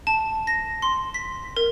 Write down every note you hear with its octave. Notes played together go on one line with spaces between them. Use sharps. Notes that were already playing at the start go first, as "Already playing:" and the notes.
A5
A#6
C6
B6
A#4